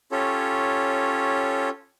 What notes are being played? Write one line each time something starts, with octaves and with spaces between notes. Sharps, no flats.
C#4 F4 G4 A4 C#5